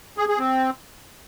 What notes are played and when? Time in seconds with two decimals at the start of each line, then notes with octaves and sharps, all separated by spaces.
0.18 G#4
0.28 G#4
0.39 C4